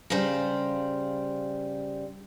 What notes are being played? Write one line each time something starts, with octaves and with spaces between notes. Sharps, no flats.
C#3 G3 C5 F5 A#5